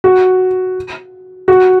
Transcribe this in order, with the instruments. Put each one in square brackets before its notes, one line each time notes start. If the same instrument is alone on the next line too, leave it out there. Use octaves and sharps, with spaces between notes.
[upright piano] F#4
F#4